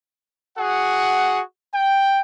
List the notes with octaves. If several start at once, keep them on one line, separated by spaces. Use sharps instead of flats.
F#4 G#4 F#5
G5